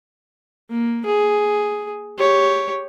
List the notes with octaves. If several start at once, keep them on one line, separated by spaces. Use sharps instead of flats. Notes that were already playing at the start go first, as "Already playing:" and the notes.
A#3
G#4
G4 C#5